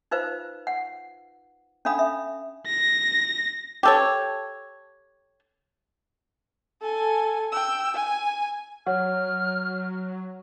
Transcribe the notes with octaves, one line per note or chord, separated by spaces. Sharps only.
D#4 F4 B4 C5 F5
F#5
C#4 D4 A4 F5 B5 D#6
E5
A#6
G4 A4 C#5
A4 G#5
G5 E6
G#5
F#3 C#5 F#5 F6